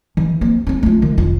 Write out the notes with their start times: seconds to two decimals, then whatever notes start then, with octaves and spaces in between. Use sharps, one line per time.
0.17 E3
0.41 A#3 C4
0.67 C4 C#4
0.83 A3 F4
1.02 D#3
1.18 F1 F4